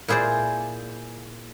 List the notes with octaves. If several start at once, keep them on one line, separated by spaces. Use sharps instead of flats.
A#2 E4 G#4 C5 D5